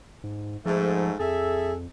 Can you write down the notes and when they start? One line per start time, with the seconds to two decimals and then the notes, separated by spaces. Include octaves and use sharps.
0.24 G#2
0.65 G#2 F3 A3
1.19 F2 G#4 A4 E5